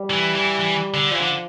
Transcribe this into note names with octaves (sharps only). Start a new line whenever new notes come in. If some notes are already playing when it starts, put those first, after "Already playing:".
Already playing: G3
E3
E3
E3
D3
E3 F3
D3